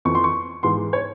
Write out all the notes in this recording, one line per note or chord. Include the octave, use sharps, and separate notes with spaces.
F2 E3 C#6
C6
C#6
G#2 E3 C6
C#5